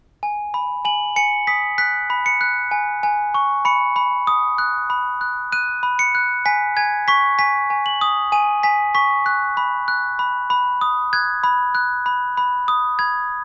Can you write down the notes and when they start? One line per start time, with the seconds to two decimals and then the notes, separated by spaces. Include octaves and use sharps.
0.23 G#5
0.54 B5
0.85 G#5 F#7
1.16 G#5 C#7
1.47 D#6 B6
1.78 F#6 B6
2.10 B5
2.26 C#7
2.41 F#6
2.71 G#5
3.03 G#5
3.34 C#6
3.65 B5 C#7
3.96 B5
4.27 D#6
4.58 F#6
4.90 B5
5.21 F#6
5.52 F#6 D#7
5.83 B5
5.99 C#7
6.15 F#6
6.46 G#5 B6
6.77 G#5 G#6
7.08 C#6 B6
7.39 G#5 B6
7.70 G#5
7.86 F#7
8.01 D#6
8.32 G#5 D#7
8.63 G#5 B6
8.95 C#6 B6
9.26 F#6
9.57 B5
9.88 F#6
10.19 B5
10.50 B5
10.81 D#6
11.13 F#6 G#6
11.44 B5
11.75 F#6
12.06 B5
12.37 B5
12.68 D#6
12.99 B5 G#6